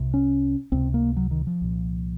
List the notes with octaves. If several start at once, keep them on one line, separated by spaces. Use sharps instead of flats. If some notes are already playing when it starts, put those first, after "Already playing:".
Already playing: C2 C3
C#4
C#2 C3 C4
A#3
F#3
D#3
F3
C2 A#2